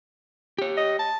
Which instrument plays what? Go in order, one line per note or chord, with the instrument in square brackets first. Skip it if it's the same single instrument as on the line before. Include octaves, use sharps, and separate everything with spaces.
[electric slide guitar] G4 C#5
[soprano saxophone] D#5
A5